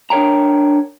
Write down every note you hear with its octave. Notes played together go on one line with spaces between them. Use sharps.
D4 A#4 C#5 G5 A#5